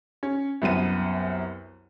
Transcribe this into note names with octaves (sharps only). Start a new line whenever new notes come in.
C#4
C2 F#2 B3 D#7